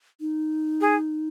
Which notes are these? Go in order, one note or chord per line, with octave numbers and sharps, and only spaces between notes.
D#4
G#4